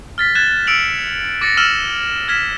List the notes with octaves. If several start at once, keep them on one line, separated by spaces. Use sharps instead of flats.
F6 A6 B6
F#6 G#6 A6 E7
E6 C#7 D7 F7 F#7
D6 A6 A#6 C#7
E6 F6 D#7 E7 F#7
F6 G#6 B6 E7